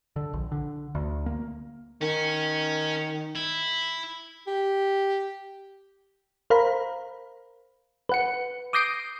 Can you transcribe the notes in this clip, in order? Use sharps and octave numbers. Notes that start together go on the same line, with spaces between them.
D3
A#1
D3
D2
A#3
D#3 C#4
E4
G4
A#4 C5 F5 A#5 B5
B4 F#5 C#7
D6 D#6 G6 A#6 C7 D7